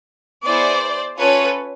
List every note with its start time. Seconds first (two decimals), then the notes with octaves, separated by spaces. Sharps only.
0.44 B3 E4 G#4 C5 D5
1.19 C#4 F4 A4 B4 C#5